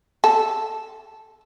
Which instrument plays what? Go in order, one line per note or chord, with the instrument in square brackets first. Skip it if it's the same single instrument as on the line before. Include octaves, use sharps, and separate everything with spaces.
[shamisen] A4